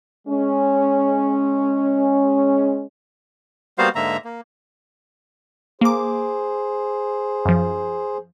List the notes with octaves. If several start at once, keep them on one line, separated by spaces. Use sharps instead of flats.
G#3 C#4
G3 A#3 B3 F#4 C5 F5
G#2 D3 A#3 E5 A#5
A#3
A#3 G#4 C5 D6
F#2 F3